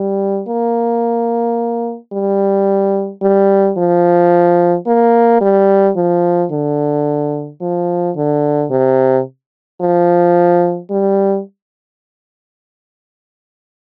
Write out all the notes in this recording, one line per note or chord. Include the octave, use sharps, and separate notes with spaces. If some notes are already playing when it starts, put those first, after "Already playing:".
Already playing: G3
A#3
G3
G3
F3
A#3
G3
F3
D3
F3
D3
C3
F3
G3